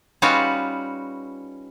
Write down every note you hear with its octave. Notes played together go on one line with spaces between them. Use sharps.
G3 C#4 D#4 F4 F#4 B4